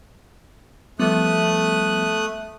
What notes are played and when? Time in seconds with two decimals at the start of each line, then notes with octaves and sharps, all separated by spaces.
0.99 F3 G3 A3 B3 D#6 F#6